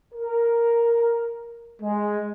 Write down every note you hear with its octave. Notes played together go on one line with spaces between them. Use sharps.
A#4
G#3